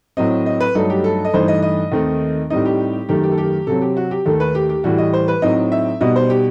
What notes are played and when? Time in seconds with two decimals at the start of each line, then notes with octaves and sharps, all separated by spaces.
0.17 A2 F#3 C4 D#5
0.46 D#5
0.61 B4
0.75 G2 F#3 A3 D#4 A4
0.90 G4
1.04 A4
1.25 D#5
1.34 G2 E3 A3 D#4 C5
1.48 D#5
1.62 D#5
1.92 D#2 D#3 A3 C4
2.50 A2 G3 C4 D#4 D#5
2.65 G4
3.09 F#2 D#3 A3 G4
3.24 G4
3.32 A4
3.38 G4
3.67 C3 F#3 C4 A4
3.82 G4
3.97 F#4
4.11 G4
4.26 D#2 D#3 A3 A4
4.40 B4
4.55 G4
4.69 G4
4.84 A2 E3 G3 F#4
4.98 D#5
5.13 C5
5.28 B4
5.42 A2 F#3 C4 D#4 D#5
5.72 E5
6.01 B2 G3 B3 D#4 D#5
6.16 C5
6.30 G4